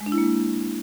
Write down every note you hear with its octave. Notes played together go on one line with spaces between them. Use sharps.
G#3
D4
E4
A#3
G#3